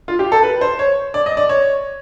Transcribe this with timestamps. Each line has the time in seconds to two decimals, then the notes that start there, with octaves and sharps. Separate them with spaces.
0.08 F4
0.19 G4
0.32 A4
0.43 B4
0.61 C5
0.79 C#5
1.14 D5
1.26 D#5
1.37 D5
1.49 C#5